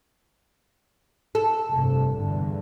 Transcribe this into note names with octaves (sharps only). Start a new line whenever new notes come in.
A4
F1 G2 C3
E2 G2 D3